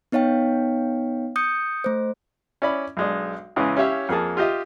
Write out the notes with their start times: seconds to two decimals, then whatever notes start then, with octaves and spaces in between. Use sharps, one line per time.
0.12 B3 D#4 C#5 F5 G5
1.36 D#6 G6 C#7
1.84 A3 C5
2.62 C#4 E4 D5 B5
2.97 B1 G#3 D4
3.56 E2 C#3 E3 G#3
3.77 C#4 E4 G4 C#5 E5 F5
4.09 F2 A#3 G#4 A5
4.37 F4 G4 D#5 E5